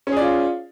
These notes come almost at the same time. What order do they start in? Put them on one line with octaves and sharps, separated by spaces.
C#4 G#4 D5 F4